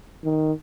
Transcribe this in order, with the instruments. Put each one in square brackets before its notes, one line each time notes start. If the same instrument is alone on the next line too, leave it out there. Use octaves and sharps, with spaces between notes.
[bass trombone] D#3